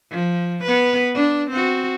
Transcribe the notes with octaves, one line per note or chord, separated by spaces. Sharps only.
F3
B3 B4
D4
C4 F#4